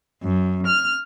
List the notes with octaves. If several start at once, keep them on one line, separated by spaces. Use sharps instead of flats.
F#2
F6